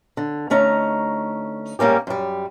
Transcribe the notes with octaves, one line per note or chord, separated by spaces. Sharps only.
D3
D2 A3 C#4 D#4 A#5
G#2 G3 A#3 C#4 G4
F#2 G3